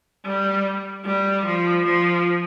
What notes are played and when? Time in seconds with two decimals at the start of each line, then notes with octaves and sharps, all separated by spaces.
0.25 G3
1.05 G3
1.46 F3
1.85 F3